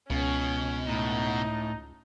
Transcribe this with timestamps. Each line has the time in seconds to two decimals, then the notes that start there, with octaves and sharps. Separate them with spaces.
0.10 C#2 B2 C#4
0.89 A2 D#4